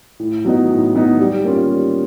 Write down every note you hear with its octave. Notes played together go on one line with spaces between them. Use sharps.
A2
F#3 B3 D#4
A2
F#3 B3 D#4
G3
A#3 C#4 F4
G3